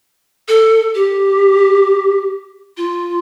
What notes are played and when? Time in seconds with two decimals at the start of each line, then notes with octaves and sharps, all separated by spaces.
0.48 A4
0.95 G4
2.77 F4